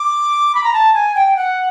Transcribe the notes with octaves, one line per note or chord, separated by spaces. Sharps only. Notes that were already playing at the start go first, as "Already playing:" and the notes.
Already playing: D6
B5
A#5
A5
G#5
G5
F#5